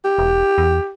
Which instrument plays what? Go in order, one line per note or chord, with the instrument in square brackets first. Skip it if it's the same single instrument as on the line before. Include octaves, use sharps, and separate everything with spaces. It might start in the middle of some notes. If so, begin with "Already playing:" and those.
[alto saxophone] G4
[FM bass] E1
E2